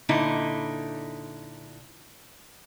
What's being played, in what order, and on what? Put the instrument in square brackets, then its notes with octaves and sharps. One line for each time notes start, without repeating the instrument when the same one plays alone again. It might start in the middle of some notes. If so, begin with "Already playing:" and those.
[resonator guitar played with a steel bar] A#2 D3 D#4 E4